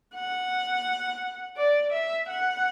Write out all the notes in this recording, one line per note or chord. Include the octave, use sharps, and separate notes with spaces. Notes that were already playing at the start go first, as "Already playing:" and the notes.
F#5
D5
E5
F#5